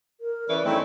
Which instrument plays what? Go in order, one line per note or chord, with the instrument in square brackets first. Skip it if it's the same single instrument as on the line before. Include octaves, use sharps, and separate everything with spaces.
[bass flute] A#4
[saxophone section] C#3 E3 [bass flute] D5
[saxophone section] G2 C#4 E4 [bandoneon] D#3 A3 C4